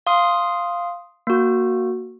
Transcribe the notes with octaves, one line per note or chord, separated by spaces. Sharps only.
F5 C6 D#6
A#3 F#4